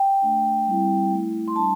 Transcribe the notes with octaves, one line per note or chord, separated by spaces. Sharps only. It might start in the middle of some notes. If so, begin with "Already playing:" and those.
Already playing: G5
A3 D4
G3 C4 E4
A3 E4
C6
G3 D4 A5